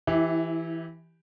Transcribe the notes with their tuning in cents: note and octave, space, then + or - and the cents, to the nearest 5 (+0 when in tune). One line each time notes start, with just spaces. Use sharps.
E3 +5 E4 -25 G4 +0